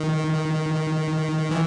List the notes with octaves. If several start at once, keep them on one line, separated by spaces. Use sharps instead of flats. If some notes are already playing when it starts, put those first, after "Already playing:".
Already playing: D#3
E3